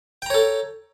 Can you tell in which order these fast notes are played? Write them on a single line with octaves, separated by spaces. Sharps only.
G5 A#5 C#5 A4